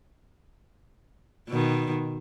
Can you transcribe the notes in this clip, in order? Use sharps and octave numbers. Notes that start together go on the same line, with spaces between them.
B2 D#3